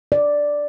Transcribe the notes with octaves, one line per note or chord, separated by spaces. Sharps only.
D5